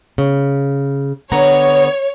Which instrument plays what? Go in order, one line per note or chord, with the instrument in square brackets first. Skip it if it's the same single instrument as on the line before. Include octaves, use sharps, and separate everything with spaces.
[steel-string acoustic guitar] C#3
[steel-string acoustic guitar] D3 B3 A#5 [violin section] C#5